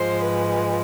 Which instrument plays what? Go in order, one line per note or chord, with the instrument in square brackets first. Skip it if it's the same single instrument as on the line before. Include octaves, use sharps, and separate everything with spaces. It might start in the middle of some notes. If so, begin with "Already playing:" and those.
Already playing: [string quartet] G#2 F3 G#3 C5
B4